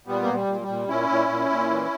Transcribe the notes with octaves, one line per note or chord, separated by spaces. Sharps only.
A#2 G3 B3
A#2 A#3
G3
A#2
G3
A#2
A#2 C#4 E4
A#2
A#2
A#2
E3